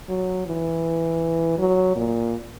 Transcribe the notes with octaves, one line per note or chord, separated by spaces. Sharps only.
F#3
E3
F#3
A#2